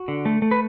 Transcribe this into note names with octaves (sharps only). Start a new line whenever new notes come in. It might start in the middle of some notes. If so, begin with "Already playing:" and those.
Already playing: F#4
D3
A3
A3
B4